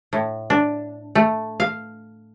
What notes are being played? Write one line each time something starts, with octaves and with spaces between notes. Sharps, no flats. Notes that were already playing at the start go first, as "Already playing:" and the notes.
A2
D4
A3
F5